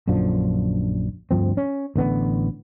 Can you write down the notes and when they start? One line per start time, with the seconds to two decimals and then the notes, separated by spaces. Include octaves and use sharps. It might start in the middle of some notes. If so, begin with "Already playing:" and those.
0.07 A#1 F#2 D3 F3
1.31 D2 G2 F3 C4
1.57 C#4
1.96 A1 D3 B3